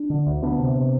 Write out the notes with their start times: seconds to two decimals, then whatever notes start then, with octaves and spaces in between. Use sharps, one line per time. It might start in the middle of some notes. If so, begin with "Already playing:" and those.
Already playing: D4
0.10 D3
0.27 D2
0.42 D2 B3 D4
0.59 C3
0.76 C3